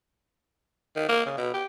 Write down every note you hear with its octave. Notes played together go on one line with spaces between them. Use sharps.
D#3
A#3
C#3
B2
G4